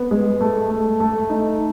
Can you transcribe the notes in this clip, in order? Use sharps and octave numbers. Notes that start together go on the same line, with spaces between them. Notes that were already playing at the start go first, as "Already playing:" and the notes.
Already playing: B3
G#3
A3
A3
A3
D#4